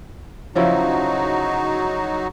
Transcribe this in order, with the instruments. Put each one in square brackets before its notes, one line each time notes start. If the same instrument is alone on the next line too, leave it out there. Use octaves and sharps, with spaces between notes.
[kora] C#3 F3 E4 [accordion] F#3 D#4 F#4